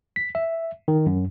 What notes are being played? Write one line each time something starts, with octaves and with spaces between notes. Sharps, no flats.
B6
E5
D#3
F#2